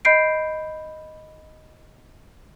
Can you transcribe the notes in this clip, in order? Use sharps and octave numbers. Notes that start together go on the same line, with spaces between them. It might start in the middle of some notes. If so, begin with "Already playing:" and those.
D#5 B5 G6 C7 D7